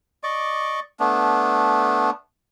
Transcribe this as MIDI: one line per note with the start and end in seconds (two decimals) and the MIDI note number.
0.23 0.80 74
0.23 0.80 75
0.23 0.80 85
0.23 0.80 86
1.00 2.10 57
1.00 2.10 59
1.00 2.10 62